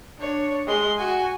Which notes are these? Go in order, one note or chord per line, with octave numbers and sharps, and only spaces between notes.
D4 C#5
G#3 C6
F#4 G#5